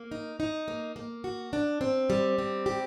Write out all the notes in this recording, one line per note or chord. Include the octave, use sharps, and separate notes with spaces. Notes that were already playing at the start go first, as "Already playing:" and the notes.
Already playing: A#3
D#4
D#4
A#3
A#3
F#4
D4
C4
G3
C4
G4